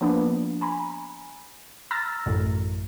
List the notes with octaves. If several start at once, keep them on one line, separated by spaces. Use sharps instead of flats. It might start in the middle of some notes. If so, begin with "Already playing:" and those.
F3 A#3 B3 D4
G#5 A#5 B5
A#5 E6 F6 A6 A#6
A1 F#2 A2